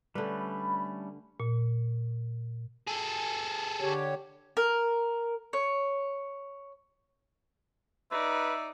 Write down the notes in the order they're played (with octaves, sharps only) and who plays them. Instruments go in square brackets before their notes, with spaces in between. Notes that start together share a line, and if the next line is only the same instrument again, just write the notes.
[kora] D3 B4 [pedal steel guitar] G3 A3 C#4
[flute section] B5
[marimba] A#2
[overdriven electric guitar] G#4 A4
[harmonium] D3 G4 C#5
[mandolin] A#4
C#5
[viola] D#4 D5 [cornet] B4 [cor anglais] E5